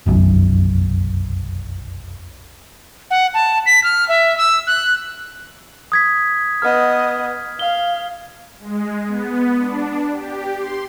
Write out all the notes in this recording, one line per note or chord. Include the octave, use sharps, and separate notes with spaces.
F1 B1 F#2
F#5
A5
B6
F6
E5
E6
F#6
D#6 G#6 B6
B3 D#5 F6
F5 G7
G#3
B3
D4
G4
C6